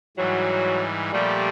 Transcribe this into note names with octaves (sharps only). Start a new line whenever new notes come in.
G#2 E3 F#3 G3
A#2 F3 G3 A3